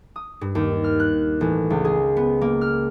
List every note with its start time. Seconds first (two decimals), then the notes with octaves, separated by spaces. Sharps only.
0.16 D#6
0.41 G2
0.55 D#2
0.84 F6
1.00 F#6
1.41 A1
1.70 C#2
1.85 G#4
2.17 B3
2.41 A#3
2.61 F6